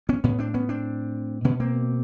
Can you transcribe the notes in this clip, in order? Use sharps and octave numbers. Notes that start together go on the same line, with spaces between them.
B3 C#4
A2 B3 C#4
C4 D4
B3 C#4
C4 D4
B2 B3 C#4
A#3 C4